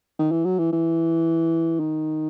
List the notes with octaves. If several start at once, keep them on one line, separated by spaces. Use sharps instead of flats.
D#3
E3
F#3
E3
E3
D#3